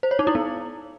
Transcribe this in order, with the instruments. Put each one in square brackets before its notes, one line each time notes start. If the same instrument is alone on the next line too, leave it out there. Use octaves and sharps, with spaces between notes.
[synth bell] C5
C#5
D#4
E4
B3